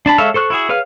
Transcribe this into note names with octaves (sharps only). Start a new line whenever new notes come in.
D4 A5 B5
G#3 A4 C#5 E5 F5
A4 C5 C#6 F#6
E4 F#4 G#4
G#4 B4 C#5 F5 F6